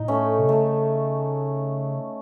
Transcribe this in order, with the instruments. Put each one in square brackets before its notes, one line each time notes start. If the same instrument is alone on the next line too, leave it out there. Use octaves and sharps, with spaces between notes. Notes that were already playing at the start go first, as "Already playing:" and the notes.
Already playing: [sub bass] A2 [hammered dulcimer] D#4
[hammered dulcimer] A3 C#4
[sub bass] C3
[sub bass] C#3 [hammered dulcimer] A3